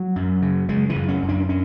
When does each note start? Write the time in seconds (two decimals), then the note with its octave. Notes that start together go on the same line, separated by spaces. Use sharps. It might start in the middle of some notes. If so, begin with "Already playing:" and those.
Already playing: F#3
0.16 F#2
0.42 C#3
0.69 C#3 G#3
0.90 E3
0.96 F#2
1.08 C#4
1.22 F#2
1.29 D4
1.49 C#4